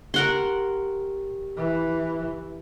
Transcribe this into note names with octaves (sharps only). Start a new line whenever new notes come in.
G4 A#4 F#5 C6
E3